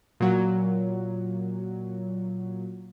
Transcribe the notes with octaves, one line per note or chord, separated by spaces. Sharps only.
A#2 F#3